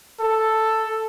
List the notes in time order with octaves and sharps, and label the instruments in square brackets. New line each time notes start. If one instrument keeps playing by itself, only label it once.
[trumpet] A4